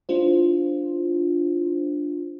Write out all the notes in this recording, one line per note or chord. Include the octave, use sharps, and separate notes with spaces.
D4 E4 F4 C5